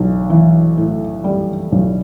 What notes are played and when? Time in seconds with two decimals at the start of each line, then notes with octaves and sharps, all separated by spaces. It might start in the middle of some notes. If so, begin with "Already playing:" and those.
Already playing: B1
0.30 E3
0.77 A2
1.24 G3
1.72 B1